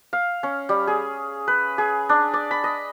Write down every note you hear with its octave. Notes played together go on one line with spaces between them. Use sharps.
F5
C#4
G3
G#4
B4
G#4
D4
D5
B5
D#5